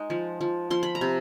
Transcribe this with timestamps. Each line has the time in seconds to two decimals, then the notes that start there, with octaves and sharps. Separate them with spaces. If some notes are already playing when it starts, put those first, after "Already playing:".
Already playing: G#3 D#4
0.10 F3
0.41 F3
0.70 F3 C6
0.83 B5
0.95 A#5
1.01 C3